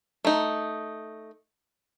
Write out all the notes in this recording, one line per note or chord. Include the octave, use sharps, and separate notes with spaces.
A3 D#4